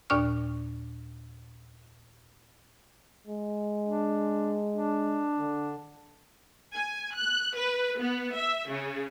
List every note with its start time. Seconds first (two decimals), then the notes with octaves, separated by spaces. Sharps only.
0.10 D#2 A#2 D4 D5 C#6 F6
3.27 G#3
3.84 D4
4.72 D4
5.39 D3
6.74 G#5
7.14 F#6
7.56 B4
7.99 B3
8.35 E5
8.69 C#3